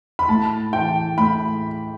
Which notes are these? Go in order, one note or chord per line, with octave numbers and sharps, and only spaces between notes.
B5
A2 A5
E3 G5
A2 B5